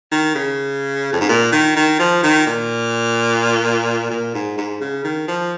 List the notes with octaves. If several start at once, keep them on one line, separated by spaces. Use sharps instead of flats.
D#3
C#3
F2
G#2
A#2
D#3
D#3
F3
D#3
A#2
A#2
G#2
G#2
C#3
D#3
F3